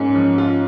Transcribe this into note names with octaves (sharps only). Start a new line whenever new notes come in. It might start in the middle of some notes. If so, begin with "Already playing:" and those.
Already playing: G#2 A#3 C#4
F3
F4